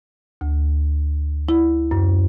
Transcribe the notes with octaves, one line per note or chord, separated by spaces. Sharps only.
D2
E4
F#2